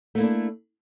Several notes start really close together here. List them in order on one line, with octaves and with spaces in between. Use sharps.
A3 A#3 E4 D4